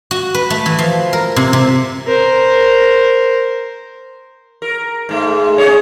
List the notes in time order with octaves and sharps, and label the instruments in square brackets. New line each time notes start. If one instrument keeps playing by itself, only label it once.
[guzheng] F#4
B4
A3
E3
F3
A#4
C3
C3
[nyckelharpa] A#4 C5
[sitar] A#4
G#2 A3
C#4 G#4 C#5